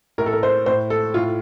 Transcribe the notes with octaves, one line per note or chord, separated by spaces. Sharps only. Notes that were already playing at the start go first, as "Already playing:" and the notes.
A2 A#4
A4
A#4
C5
A2 C5
A4
A2 F4